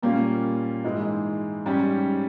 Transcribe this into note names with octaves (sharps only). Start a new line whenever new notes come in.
A#2 G3 A#3 C#4 F4
G#2 E3 G#3 E4
G#2 G3 C#4